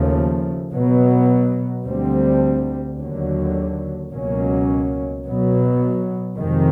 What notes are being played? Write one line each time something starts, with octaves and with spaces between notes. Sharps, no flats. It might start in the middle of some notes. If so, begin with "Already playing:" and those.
Already playing: D#2 C#3 F3 A3
B2 F#3 B3
D2 D3 G3 C4
D#2 D3 F#3
C#2 B2 F#3 A#3 C#4
B2 F#3 B3
F2 C3 D#3 G#3